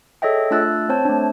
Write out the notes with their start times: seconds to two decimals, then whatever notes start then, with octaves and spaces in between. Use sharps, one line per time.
0.22 G#4 A4 C#5 D#5 E5 G5
0.51 A3 D4 F4 E6 F#6 A6
0.89 C4 C5 C#5 A5
1.05 A3 D4